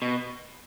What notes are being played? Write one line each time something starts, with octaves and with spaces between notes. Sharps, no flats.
B2